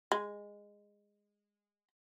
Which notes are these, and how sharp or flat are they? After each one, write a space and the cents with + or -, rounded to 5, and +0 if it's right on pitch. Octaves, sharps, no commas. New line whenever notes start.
G#3 -15